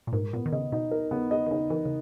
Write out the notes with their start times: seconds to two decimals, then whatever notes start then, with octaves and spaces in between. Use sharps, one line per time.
0.07 A#2
0.13 G#2 A#4
0.33 A#2 B3
0.46 D#3
0.52 C#3 D#5
0.72 B2 D#4
0.91 A#4
1.11 C#3 B3
1.31 C#3 D#5
1.46 D#3
1.51 C#3 D#4
1.70 E3 A#4
1.85 C#3